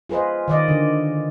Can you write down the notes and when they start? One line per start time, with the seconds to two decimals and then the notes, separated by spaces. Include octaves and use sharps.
0.09 F4 G#4 B4 C5 D#5
0.48 D#3 D5 D#5
0.68 D3